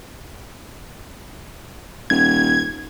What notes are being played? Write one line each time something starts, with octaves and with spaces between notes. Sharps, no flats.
D#1 G#6